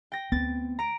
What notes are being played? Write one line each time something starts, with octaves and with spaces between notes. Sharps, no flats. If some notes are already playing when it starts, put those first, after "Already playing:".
G5 A#6
D2 B3 C4 A6
A#5 D7